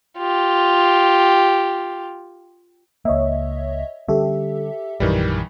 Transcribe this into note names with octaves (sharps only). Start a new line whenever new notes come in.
F4 G4
C#2 A#3 C#5 D#5 E5
D3 G3 C#4 G4 A4 E5
A#1 F#2 D#3 E3 G3